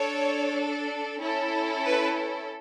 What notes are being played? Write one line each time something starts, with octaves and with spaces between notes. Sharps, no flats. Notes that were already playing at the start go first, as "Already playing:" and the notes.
Already playing: D4 A4 C#5
C#4 E4 A4
B4